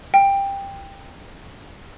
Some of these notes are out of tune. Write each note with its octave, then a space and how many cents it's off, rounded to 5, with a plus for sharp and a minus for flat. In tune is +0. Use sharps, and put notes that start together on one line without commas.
G5 +15